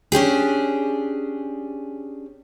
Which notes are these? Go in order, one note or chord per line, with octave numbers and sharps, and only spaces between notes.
C#4 D4 G4 G#4